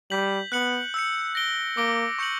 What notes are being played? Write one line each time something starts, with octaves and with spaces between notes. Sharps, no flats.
G3 G6 B6 F#7
B3 F#6 C#7 F#7
E6 G6 C#7
A#6 D7 G7
A#3 D6 A#6 D7 G7
C#6 G6 C#7 F#7